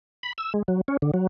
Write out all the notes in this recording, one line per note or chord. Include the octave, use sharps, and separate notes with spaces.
B5
E6
G#3
F#3
C#4
D3
F#3